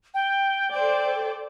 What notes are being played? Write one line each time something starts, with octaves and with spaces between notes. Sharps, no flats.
G5
A4 C5 D5 G5